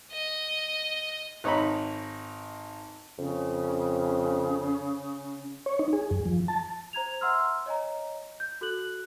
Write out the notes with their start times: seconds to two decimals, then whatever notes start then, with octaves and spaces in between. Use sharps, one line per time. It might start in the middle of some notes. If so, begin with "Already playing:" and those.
0.12 D#5
1.44 G#1 D#4 C#5 A#5 B5
3.18 F2 C#3
5.66 C#5
5.79 D#4
5.93 G#4
6.11 F#2
6.26 F3
6.48 A5
6.93 C5 A#5 G#6 F7
7.21 E5 F#5 A#5 C6 E6 F6
7.66 C#5 D#5 G#5 A#5
8.40 G6
8.61 F#4 A4 F#6 F#7